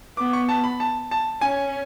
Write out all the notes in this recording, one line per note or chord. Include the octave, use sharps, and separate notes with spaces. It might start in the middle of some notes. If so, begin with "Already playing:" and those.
B3 D6
C#6
A5
B5
A5
A5
C#4 G#5